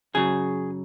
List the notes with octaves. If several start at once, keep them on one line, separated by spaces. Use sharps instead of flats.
F#2 C#3 F#3 G#4